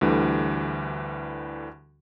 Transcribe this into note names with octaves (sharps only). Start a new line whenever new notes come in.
D2 D3 E3 G3